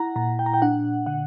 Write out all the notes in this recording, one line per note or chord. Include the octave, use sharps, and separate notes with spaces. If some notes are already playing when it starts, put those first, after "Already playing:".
Already playing: E4 F#5 A#5
A#2 A#5
G5
A#5
G5
D4 F#5
D3 F#5